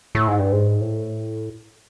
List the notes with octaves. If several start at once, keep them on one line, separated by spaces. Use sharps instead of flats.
A2
G#2
G2
G#2
A2